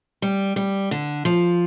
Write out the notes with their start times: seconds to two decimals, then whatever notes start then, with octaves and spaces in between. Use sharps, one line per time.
0.22 G3
0.56 G3
0.91 D3
1.25 F3